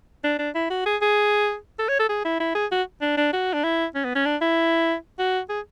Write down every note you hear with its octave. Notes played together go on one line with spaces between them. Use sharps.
D4
D4
E4
F#4
G#4
G#4
A4
C#5
A4
G#4
E4
E4
G#4
F#4
D4
D4
F#4
D4
E4
C#4
B3
C#4
D4
E4
F#4
G#4